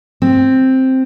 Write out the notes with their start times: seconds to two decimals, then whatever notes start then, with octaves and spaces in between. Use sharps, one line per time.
0.22 C4